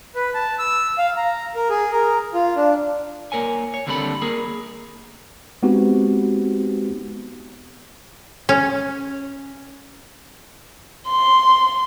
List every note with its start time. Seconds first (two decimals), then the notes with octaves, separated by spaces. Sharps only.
0.15 B4
0.34 A5
0.59 E6
0.98 F5
1.17 A#5
1.55 A#4
1.70 G#4
1.92 A#4
2.34 F4
2.56 D4
3.32 A#3 A#4 C#5 G#5
3.74 C#5
3.87 D#2 D3 G3 C4 A4 B5
4.22 A#3 G#4 A#4
5.63 G#3 B3 C4 D#4 F#4 G4
8.49 C#4
11.09 C6